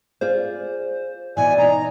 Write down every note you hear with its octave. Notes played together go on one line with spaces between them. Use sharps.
F4 G#4 C5 D5
B2 E3 D5 G#5
D#4 A#5